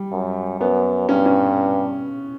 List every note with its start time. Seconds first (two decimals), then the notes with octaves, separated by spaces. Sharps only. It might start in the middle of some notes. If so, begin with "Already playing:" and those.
Already playing: G3
0.11 F#2
0.60 F#2 B3
1.09 G2 C#4
1.26 C#4